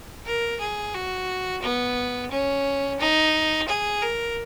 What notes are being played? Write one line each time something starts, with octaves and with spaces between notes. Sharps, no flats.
A#4
G#4
F#4
B3
C#4
D#4
G#4
A#4